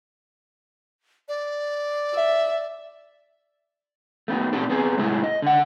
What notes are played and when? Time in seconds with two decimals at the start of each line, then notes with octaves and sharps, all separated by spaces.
1.28 D5
2.14 E5
4.28 A3 B3 D#4
4.53 A#2 C4 D#4 G4 A4
4.70 B3 C4 G#4
4.97 G#2 C3 G#3 A3 D#4 E4
5.24 D#5
5.42 D3 F#5